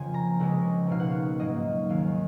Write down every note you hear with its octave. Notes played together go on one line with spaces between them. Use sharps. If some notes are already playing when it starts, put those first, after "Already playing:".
Already playing: F2 C#3 F3 A#3 G#5
A#5
C#2 C#3 G#3
C#2 B2 A#3 D#4 F5
F#5
F5
G#2 F#3 A#3 D#5
D#2 D#3 G#3 F5